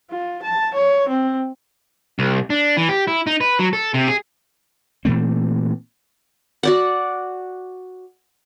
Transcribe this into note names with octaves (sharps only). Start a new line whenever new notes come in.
F4
A5
C#5
C4
C2
D4
E3
G4
E4
D#4
B4
F#3
A4
C3
G#4
A#2 E3 A3 C4
F#4 D5 F#5